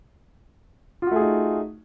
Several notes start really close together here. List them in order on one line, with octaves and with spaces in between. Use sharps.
F4 F#4 A3 G#4 D#4